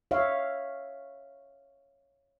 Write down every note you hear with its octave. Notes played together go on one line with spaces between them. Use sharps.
C#5 E5 F5